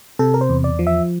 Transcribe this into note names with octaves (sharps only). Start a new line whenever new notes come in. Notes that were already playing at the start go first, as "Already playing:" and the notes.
C3 A4
A#4
C5
E2
D5
F3
E5